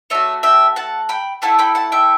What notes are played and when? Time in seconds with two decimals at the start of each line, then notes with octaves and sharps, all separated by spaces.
0.10 A3 D4 F#4 C#5 E5
0.43 E5 G5
0.76 F#5 A5
1.09 G5 B5
1.42 A3 E4 A4 F#5 A5
1.59 G5 B5
1.75 F#5 A5
1.92 E5 G5